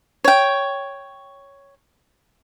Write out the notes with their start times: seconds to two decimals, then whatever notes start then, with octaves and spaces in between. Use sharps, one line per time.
0.24 C#5 G5